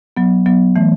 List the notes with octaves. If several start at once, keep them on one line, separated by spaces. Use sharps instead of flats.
F#3 B3
F#3 B3
E3 A3